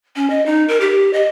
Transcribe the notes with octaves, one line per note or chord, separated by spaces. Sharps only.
C#4
D#5
D#4
A#4
G4
D#5